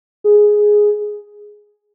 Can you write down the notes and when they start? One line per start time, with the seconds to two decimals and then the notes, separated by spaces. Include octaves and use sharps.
0.24 G#4